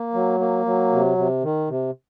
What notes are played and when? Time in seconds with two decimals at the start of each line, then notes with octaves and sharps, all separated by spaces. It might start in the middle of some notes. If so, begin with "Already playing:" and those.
Already playing: A#3
0.14 F#3
0.40 A#3
0.66 F#3
0.92 C3
1.18 C3
1.43 D#3
1.69 C3